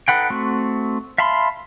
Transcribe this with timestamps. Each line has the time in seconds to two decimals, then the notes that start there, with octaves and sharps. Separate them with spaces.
0.08 D#4 A4 B4 F#5 G5
0.30 A3 C4 F#4
1.18 E5 F5 A5 B5 C6